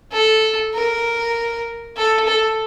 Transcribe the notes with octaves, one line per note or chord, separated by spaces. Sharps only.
A4
A#4
A4
A4